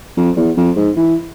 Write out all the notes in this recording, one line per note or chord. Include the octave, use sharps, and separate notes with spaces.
F2
E2
F2
G#2
E3